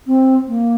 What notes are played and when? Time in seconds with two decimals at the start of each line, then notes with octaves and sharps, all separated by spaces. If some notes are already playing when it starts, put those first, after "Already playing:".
0.07 C4
0.48 A#3